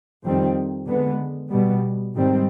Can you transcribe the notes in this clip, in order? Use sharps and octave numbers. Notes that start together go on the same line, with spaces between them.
F2 D#3 G3 C4
D3 G#3 B3
B2 G3 B3
G#2 D#3 G3 C4